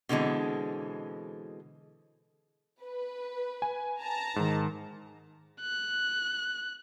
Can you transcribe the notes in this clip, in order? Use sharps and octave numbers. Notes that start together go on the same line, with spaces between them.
B2 D3 E3 G#3 C4
B4
G#5
A5 A#5
G#2 D#3
F#6